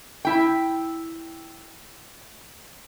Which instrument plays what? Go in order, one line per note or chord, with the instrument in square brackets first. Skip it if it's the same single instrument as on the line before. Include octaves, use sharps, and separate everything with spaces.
[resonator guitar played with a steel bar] E4 G5